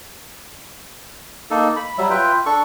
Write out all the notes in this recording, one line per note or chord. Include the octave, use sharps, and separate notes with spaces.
A#3 D#4 A4
B5
F#3 G3 E5
F4 B4 E5 G5
D4 A4 C#6